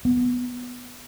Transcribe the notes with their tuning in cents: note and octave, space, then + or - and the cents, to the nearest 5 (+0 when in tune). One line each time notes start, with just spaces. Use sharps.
B3 -5